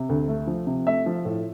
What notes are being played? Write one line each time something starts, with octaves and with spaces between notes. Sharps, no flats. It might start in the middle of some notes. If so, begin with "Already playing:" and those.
Already playing: C3
D2
A3
F3
C3
A3 E5
F3
A2